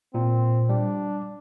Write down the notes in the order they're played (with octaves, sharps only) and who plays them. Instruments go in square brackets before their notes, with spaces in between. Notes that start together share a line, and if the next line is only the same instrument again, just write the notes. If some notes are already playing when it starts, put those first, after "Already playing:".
[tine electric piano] A#2 [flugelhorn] C4
[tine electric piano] G3 [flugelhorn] D4